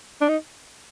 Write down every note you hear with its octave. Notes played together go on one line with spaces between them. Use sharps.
D4
D#4